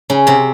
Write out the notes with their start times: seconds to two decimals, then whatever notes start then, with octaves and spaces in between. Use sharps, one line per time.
0.10 C#3 C#4
0.27 C3 C4